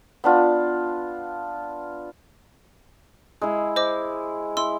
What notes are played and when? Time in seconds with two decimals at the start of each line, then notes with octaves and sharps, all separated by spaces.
0.24 B3 D4 F4
3.42 G#3 E4
3.76 C5 D#5 D6
4.57 E4 C6 E6